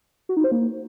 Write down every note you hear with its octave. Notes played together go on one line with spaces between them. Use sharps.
F#4
D#4
C5
A#3